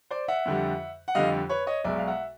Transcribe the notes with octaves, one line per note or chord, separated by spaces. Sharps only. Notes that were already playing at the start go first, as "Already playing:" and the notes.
C5 D5
E5 F#5
F2 D3 G3
F#5
F2 D3 G3 D#5 F5
B4 C#5
C#5 D#5
B1 B2 G#3 D5 E5
F5
E5 F#5